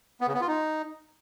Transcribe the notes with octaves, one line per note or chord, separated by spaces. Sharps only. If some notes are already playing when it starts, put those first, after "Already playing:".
B3
C#3
B3
F4
D#4